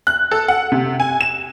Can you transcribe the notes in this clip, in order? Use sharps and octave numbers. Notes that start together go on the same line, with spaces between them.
F#6
A4
F#5
C3
G#5
E7